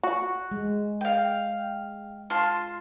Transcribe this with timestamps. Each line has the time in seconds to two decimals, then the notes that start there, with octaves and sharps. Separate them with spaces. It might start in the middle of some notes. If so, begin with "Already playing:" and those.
0.03 F#4
0.52 G#3
1.01 F5 G5
2.30 F4 A5 C6